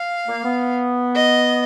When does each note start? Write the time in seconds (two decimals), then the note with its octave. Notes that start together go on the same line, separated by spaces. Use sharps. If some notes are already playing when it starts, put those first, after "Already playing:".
Already playing: F5
0.27 A#3
0.44 B3
1.15 D#5